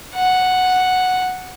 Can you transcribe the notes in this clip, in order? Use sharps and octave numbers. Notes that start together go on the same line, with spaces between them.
F#5